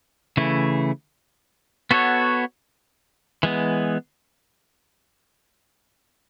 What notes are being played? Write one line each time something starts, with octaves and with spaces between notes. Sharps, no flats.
C#3 E3 A3 E4
B3 F#4 A4 C#5
E3 G#3 B3